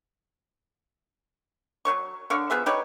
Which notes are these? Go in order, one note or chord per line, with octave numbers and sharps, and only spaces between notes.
F#3 C4 C#5 C#6
D3 C#5 F5 C#6
F3 B3 G#4 E5
D#4 G4 B4 C#5